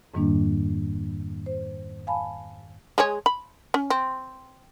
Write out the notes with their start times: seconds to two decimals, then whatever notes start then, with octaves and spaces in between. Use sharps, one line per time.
0.14 F2 G#2 D#3 G3 A#3 D4
1.46 C5
2.07 F5 G#5 A5 B5
2.98 G#3 G#4 C#5
3.26 B5
3.74 C#4
3.90 C4